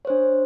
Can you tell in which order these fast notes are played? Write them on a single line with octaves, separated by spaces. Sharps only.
C#5 C5 D4